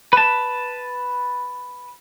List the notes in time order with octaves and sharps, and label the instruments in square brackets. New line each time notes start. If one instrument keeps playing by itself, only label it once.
[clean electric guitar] B4 A5